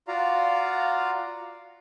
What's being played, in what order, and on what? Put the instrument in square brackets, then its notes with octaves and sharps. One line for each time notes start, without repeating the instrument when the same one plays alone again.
[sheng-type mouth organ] F4 F#4 D5 F5 A#5